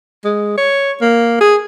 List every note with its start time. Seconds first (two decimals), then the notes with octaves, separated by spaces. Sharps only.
0.25 G#3
0.58 C#5
1.02 A#3
1.41 G#4